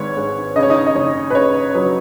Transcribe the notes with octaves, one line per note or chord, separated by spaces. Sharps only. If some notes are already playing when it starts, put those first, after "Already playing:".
Already playing: G#1 G#2 B4 C#5
G#2
C#3 D#5
C#5
D#4 D#5
D#5
F#1 C#5
B4
C#3 C#5
F#3 B4